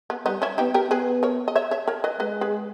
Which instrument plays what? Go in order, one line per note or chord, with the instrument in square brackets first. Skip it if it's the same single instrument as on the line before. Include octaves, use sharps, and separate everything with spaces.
[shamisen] B3
[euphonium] G3 [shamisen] B3 D#4
[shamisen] C#4 E4
[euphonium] B3 [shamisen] D#4 G4
[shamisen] G4 A#4
[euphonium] B3 [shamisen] G#4 B4
[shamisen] A#4 C#5
D#5
C#5 E5
C#5 E5
A#4 C#5
B4 D#5
[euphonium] G#3 [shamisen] B4 D#5
[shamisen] G#4 B4